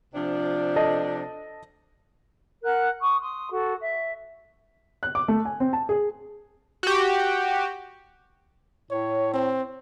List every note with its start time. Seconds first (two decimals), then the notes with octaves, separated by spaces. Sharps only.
0.14 C3 F3 D4
0.76 A4 D#5 A5
2.63 A#4 F#5 F#6
3.01 C#6 D#6
3.20 C6 D#6
3.52 F#4 A4
3.80 E5
5.03 F#6
5.15 D6
5.28 A3
5.45 G#5
5.60 C4
5.73 A5
5.89 G#4
6.83 F#4 G4
8.91 A2 C#5
9.34 C4